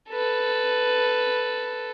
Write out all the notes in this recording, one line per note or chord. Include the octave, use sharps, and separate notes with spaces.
A4 B4